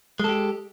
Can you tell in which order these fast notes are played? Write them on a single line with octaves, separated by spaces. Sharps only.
G#3 A4 G4